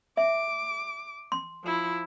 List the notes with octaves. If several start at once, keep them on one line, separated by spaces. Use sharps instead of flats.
E5 D6
C6
F3 E4